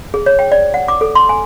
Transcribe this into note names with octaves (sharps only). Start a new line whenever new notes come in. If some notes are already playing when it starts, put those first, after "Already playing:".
G#4
C#5
G5
D5
F#5
D6
A4
C6
G#5